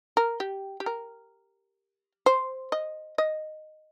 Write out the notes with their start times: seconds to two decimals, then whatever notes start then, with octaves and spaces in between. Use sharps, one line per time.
0.17 A#4
0.40 G4
0.80 G4
0.86 A#4
2.26 C5
2.72 D#5
3.18 D#5